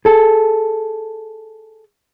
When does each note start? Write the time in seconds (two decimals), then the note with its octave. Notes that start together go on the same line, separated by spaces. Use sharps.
0.05 G#4 A4